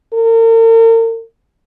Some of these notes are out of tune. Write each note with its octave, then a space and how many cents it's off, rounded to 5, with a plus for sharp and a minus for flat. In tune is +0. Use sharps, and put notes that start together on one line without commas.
A#4 -40